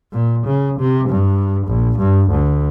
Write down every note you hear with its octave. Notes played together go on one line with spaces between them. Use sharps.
A#2
C#3
C3
G2
A#1
G2
D2